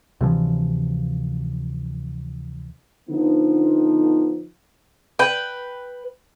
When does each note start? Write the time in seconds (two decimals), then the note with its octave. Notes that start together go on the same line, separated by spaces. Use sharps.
0.21 D2 C3 E3 F3
3.10 D3 F3 B3 D#4
5.19 B4 G5